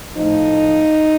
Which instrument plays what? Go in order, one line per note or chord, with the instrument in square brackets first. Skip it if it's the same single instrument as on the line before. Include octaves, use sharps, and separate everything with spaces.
[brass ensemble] A2 F3 D#4